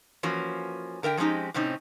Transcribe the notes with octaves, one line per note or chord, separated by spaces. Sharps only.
E3 F3 A#3 C#4 F#4
D3 A#4 E5 G5
F3 G#3 C4 C#4 D#4 G4
A2 C3 C4 C#4 D#4